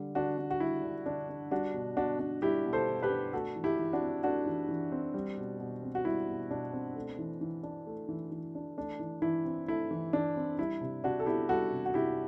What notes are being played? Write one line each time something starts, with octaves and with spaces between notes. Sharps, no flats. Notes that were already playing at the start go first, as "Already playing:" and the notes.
Already playing: D3 G3
D3 D4 F#4
D4
F#4
G3 E4
D3
D3 D4
D4
G3 D4 F#4
B2
B2 D4 F#4
D4
G3 E4 G4
B2
A4 C5
B2
G4 B4
D4
A3 F#4 A4
E3
E4 G4
E3
D4 F#4
C4
A3 D4 F#4
E3
E3
C4
G3
B2
B2
C4
F#4
G3 E4
B2
B2 D4
C4
A3
E3
E3
D4
A3
E3
E3
D4
A3 D4
E3
E3 E4
C4
A3 E4
E3
E3 D4
C4
G3 E4
C3
C3 D4 F#4
A4
B3 E4 G4
G3 F#4 A4
C3
F#4
C3 E4 G4